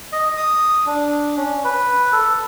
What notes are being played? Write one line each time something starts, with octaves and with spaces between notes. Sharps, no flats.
D#5
D#6
D4
C#4
B4
A4